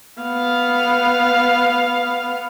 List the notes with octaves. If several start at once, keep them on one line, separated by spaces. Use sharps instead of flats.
B3 F5